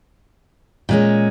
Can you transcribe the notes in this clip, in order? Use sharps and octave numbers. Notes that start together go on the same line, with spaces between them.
A#2 G#3 C#4